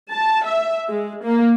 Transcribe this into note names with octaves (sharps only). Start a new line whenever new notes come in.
A5
E5
G#3
A#3